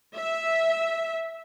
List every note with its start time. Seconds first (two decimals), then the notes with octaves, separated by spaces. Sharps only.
0.15 E5